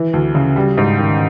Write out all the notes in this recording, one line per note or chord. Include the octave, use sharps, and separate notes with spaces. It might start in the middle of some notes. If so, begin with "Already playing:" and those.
Already playing: E3
D2
C#3
G3
G#2
D#3